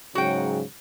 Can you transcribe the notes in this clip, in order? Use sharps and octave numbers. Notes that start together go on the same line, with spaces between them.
G#2 C#3 F#3 F#4 G5